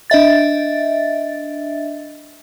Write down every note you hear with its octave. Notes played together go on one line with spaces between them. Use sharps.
D4 D#5 E5 A6